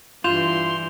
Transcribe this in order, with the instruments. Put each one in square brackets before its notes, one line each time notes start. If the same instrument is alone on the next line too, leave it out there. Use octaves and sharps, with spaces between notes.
[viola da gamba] G2 E3 [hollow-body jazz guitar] F4 [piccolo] C6 [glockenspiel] G6 E7 F7